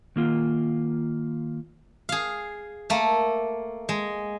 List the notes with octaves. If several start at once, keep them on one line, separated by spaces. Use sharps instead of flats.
D#3 A#3 F4
G#4 F5
A3 A#3
G#3